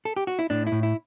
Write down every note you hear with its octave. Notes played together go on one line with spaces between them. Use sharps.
A4
G4
F#4
E4
A2 D4
E4
A2
E4